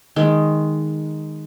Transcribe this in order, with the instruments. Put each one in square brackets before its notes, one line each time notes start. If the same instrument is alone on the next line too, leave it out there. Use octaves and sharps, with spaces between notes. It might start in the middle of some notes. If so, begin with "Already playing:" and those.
[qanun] D#3 G#3